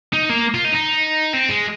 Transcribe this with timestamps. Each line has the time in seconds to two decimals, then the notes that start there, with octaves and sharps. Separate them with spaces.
0.13 D#4
0.29 A#3
0.54 F4
0.65 D#4
0.75 D#4
1.34 C4
1.49 G#3